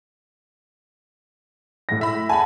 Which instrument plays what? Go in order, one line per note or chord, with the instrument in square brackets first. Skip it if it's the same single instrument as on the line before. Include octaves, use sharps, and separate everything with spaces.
[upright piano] A2 A#6
[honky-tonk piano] E5 B5
[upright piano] F#5 A5 [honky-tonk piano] G#5 B5